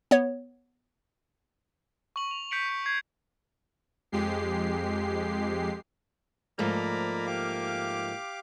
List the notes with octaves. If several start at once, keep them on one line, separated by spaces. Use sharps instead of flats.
B3 C#5
C#6 F#7
F7
G6 B6 C#7 D7 F#7
B6
G#6 C7
F2 G#3 G4 C7
G#2 F3 A3 A#3 D5 A#5 B5
G4 F5 D6